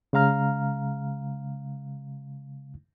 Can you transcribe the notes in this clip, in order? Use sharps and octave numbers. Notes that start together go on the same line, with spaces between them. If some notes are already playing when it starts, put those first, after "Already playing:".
C#3 G#3 F5 A#5 F6